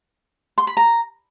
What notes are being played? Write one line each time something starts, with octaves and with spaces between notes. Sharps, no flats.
C6
B5
A#5